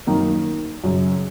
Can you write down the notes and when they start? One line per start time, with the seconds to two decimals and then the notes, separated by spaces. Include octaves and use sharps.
0.07 F#2 D#3 A#3 D#4 A#4
0.84 F#2 C#3 F#3